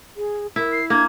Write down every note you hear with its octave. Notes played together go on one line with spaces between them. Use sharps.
G#4
E4 A#4
C7
A#3 D4 G#6